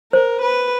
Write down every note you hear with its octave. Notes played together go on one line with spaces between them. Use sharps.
A#4 C5
B4